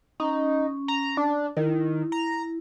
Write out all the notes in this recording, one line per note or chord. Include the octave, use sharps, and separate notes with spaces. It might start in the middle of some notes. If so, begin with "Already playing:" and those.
C#4 D#4
A#5
D4
D#3 E4
A#5